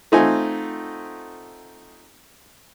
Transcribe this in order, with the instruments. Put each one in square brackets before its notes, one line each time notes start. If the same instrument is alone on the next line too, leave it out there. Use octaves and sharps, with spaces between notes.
[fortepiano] A3 C4 D#4 F4 F#5 G#5